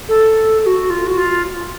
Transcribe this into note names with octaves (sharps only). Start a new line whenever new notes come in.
A4
A4
F#4
F4
F#4
F4